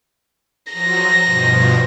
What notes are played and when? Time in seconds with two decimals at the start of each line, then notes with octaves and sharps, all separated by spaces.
0.73 F3 F#3 A#6
1.23 G2 B2 F3